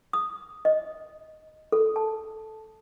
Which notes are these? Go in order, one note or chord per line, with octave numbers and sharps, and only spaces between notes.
D#6
D#5
A4
A5